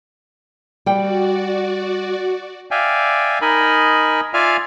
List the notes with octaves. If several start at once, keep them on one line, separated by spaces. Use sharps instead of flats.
G3 F#4 D5 G5
D5 E5 F5 G5 G#5
D#4 A#4 D#5 G#5 B5
F4 D5 E5 F5 G#5 F6